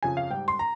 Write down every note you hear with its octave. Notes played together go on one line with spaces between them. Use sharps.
F2 C#3 F3 G#5
F5
G#2 G3 G5
C6
A#5